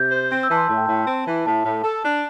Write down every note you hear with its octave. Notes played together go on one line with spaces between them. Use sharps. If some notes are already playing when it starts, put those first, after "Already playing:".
Already playing: C3 G6
C5
C4 G6
E6
E3 A5
C6
A2 A5
G5
A2 A5
C4
E3
A2 A5
A2
A4
D4